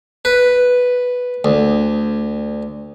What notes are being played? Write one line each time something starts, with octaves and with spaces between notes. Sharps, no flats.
B4
D2